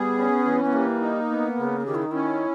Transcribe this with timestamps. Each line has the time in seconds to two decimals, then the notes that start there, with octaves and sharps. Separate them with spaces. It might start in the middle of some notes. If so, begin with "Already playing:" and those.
Already playing: G3 B3 G#4
0.18 C#4
0.45 E3
0.64 B3
0.73 G3 A#3
1.01 D#4
1.30 B3
1.58 C#3
1.86 D#3 G4
1.95 E4
2.02 D#4
2.11 C#4 E4